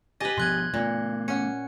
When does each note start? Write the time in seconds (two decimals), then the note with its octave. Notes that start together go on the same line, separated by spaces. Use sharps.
0.20 G4 B4 D#5 G#5 A6
0.38 B2 F3 B3 C6 F#6 G#6
0.74 A#2 A3 B3
1.28 C#4 F#5 C#7